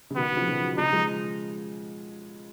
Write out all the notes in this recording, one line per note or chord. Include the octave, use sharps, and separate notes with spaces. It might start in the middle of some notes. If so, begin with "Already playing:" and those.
C#3
B2 D#3 B3
F#3
C#3 F3
B2 D#3
C#3 F3 D#4
F3 G#3